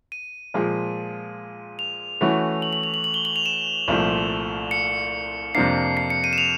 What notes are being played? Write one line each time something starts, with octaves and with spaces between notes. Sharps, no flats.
D#7
A#2 F3 G#3
F7
E3 A3 C#4 F#4
F#7
F#7
F7
F#7
F#7
G7
F#7
F7
E7
C2 A#2 F3 A3
C#7
F2 C3 F3 A#3 D4 C7
C7
C#7
D#7
E7
F7